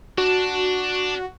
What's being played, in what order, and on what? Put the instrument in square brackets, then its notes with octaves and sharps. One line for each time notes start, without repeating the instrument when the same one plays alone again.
[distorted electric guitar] D4 [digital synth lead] F#4